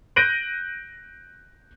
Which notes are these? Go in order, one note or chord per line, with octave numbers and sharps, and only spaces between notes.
F#6 G6 A#6 D7 D#7 F#7